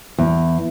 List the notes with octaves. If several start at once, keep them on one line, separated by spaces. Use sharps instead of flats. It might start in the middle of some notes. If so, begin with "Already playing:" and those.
E2